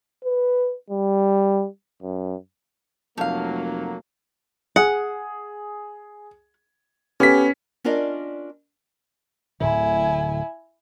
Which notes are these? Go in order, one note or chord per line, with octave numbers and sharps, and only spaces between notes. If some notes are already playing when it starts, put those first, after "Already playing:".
B4
G3
F#2
F1 F#3 A3 A#3 F5
G#4 F#5
B3 C#4 G4 A4 G#5 B6
C#4 D4 F4 A#4 D5 D#5
D1 A2 D3 E4 G#5